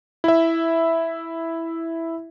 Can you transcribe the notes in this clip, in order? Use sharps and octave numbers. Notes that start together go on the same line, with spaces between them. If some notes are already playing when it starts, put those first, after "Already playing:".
E4 E5